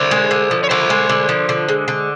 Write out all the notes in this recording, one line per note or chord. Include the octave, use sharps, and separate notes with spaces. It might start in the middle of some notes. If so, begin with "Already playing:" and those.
Already playing: D3 C5 D5
G#3
D3
F3
C#5
D3 C5 D5
G#3
D3
F3
D3
G#3
D3